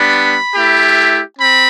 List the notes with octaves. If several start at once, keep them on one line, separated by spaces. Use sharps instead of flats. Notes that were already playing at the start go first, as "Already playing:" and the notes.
Already playing: G3 B3 D4 B5
A3 E4 G4
C4 B5